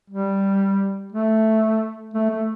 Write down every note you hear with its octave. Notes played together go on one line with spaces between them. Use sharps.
G3
A3
A3
A3